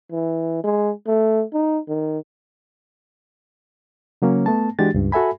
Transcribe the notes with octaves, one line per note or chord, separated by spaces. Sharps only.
E3
G#3
A3
D#4
D#3
C#3 F#3 A#3 C#4
A3 B3 A5
E3 G#3 D4 F#4 G4 A6
C#2 G2
F#4 A4 E5 G#5 B5